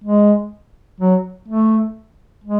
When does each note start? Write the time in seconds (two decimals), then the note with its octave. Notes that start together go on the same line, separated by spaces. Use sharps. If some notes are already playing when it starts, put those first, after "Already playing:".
0.04 G#3
1.00 F#3
1.48 A3
2.44 G#3